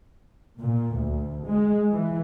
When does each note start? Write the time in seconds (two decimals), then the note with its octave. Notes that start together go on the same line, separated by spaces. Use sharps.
0.59 A#2
0.95 D2
1.46 G#3
1.92 E3